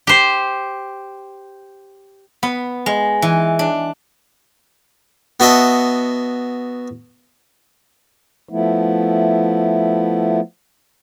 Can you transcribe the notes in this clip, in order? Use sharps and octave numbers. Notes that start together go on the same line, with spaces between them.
G4 C5
B3
G#3
E3
D4
B3 F#4 D#5 E5 A5
F3 A3 B3 E4